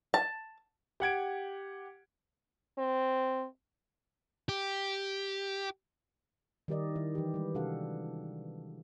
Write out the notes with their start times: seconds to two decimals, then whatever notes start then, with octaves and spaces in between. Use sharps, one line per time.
0.14 A5
1.00 G4 F#5 G#6 D7
2.78 C4
4.49 G4
6.68 D#3 G3 G4 A#4 D5 D#5
6.95 D#3 E4
7.15 E3 G4
7.34 G3 G#3 B4
7.55 C3 D4 F#4 A4 F5 F#5